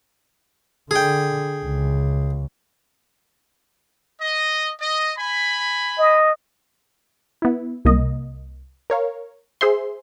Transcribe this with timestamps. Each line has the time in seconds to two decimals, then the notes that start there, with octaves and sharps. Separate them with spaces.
0.91 D3 G#4 G5
1.65 C#2
4.21 D#5
4.80 D#5
5.17 G#5 B5
5.99 D#5
7.42 B3 E4
7.85 C2 A#3 D#5
8.90 A#4 C#5 F5
9.61 G#4 C5 E5 C6